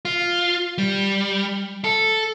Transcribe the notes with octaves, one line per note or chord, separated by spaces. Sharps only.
F4
G3
A4